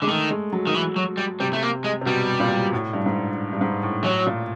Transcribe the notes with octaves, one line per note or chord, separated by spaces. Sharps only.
D3 G#3
D#3 A3
G#3
F#3
D#3
E3
F#3
G3
C3 G3
A3
A#3
G#3
C3
B2 G3
A#2
A2
G2
G#2
G2
G#2
A2
A2 F#3
A#2